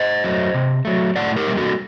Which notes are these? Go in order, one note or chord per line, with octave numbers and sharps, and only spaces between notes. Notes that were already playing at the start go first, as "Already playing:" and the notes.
Already playing: C5 D#5
F#3 A3
C3
F#3 A3
A2 D5 F#5
G4 A#4
G3 A#3
F#4 A4